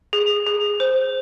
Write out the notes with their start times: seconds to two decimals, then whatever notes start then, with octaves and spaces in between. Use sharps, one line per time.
0.13 G#4
0.46 G#4
0.80 C5